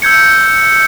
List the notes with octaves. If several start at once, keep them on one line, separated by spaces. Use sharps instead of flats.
E6 G6 G#6 C#7